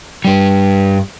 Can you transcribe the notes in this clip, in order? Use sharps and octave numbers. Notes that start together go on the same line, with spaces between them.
G2 G3